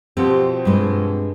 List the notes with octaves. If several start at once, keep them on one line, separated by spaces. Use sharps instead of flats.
B2 F3 C4 F#4 G4 C5
G2 G#3